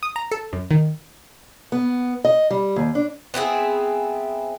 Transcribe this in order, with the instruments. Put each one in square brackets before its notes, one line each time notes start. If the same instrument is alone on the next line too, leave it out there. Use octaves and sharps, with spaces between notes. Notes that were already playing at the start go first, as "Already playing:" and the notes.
[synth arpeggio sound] D#6
A#5
A4
F#2
D#3
[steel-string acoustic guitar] B3
D#5
G3
D#2
D4
[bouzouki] B3 C4 E4 G#4